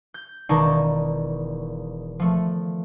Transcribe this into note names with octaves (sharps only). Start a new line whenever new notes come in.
G6
E1 D#3 D#4 D5 A5 C#6
F3 A3